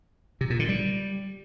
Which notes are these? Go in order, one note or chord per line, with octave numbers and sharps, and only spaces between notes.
C3
A#2
D3
G3